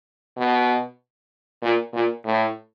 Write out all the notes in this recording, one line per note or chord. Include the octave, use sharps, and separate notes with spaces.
B2
A#2
A#2
A2